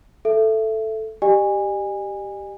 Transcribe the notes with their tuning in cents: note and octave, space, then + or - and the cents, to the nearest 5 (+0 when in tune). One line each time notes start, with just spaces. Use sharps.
A4 +0 E5 +15
G4 +0 D#5 -45 G#5 -25